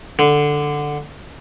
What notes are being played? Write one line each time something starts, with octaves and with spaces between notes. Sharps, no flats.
D3